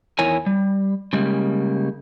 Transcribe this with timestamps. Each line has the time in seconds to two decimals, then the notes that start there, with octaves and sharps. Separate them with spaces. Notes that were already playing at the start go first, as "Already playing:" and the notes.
0.19 E2 D#3 E4 A#4 C#5 G#5
0.46 G3
1.13 C#3 G3 G#3 A#3